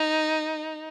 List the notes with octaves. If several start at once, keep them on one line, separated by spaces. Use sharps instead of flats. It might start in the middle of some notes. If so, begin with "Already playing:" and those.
Already playing: D#4